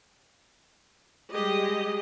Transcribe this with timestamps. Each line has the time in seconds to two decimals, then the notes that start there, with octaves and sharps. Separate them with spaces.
1.33 G3 G#3 G4 G#4 D#5